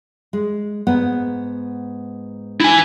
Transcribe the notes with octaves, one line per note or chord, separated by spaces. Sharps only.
G#3
G#2 B3 F#5
E4 G#5